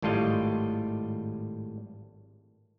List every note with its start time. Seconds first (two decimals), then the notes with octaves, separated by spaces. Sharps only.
0.02 G#1 A2 G3 F4 D#5